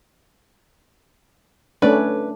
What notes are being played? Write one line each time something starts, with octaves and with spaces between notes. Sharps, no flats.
A3 C#4 D4 B4 D5